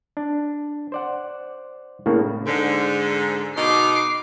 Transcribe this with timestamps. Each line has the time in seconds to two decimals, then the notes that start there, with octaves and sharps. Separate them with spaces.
0.17 D4
0.92 C5 D5 F#5
2.06 A2 C#3 A#3 D4
2.46 G#2 D3
3.56 B2 D#4 D6 C7